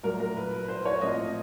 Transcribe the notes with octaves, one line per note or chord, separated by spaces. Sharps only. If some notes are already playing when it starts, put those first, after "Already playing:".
A#2 F#3 A3 A#4
A#4
B4
B4
C5
C#5
A#2 F3 A3 C4 D#5